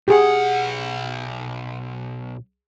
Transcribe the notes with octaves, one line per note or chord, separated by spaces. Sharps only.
B1 G4 G#4 F#5